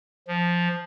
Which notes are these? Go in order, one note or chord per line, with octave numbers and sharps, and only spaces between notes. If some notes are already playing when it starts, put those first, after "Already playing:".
F3